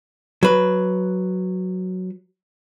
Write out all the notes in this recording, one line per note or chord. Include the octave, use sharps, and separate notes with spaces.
F#3 B4